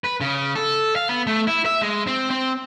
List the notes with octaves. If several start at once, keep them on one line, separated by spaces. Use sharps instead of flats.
B4
C#3
A4
F5
B3
A3
E4
E5
G#3
C4
C4